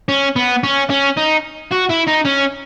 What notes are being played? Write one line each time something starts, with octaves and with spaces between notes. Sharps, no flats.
C#4
B3
C#4
C#4
D#4
F#4
E4
D#4
C#4